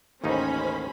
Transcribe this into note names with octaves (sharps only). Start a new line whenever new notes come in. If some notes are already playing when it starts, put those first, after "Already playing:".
A1 D#2 C#4 D#4 C5 B5